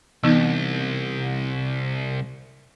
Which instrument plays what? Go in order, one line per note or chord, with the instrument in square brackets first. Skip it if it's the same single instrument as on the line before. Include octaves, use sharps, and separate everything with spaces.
[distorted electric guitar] C2 [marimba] E3 B3 D#4